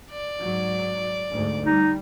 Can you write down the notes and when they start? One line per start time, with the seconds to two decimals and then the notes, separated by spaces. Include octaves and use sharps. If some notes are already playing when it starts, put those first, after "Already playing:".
0.10 D5
0.41 G#2 F#3
1.32 D2 G#2
1.65 G3 D#4